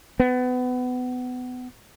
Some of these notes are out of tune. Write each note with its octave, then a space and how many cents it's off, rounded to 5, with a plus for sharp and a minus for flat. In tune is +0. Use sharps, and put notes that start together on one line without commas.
B3 +25